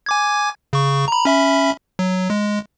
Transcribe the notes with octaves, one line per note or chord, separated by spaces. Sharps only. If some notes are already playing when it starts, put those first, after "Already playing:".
G#5 D6 G#6
C#3 C#6
A#5 B5
C#4 E5 B5
F#3
G#3